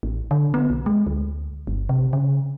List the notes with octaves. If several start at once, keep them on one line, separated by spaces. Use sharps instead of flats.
A1
D3
B3
B1
G#3
D2
G1
C3
C#3